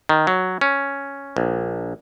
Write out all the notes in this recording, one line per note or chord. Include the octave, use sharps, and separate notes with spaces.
D#3
F#3
C#4
A#1